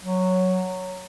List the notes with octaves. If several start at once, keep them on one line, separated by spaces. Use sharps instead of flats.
F#3